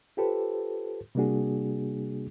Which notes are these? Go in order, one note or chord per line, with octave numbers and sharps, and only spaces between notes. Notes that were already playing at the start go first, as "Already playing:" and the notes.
F4 G4 A4 B4 C5
C3 G3 A#3 D4 F#4 G#4